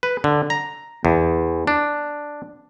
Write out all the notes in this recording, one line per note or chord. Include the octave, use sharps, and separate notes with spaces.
B4
D3
A#5
E2
D4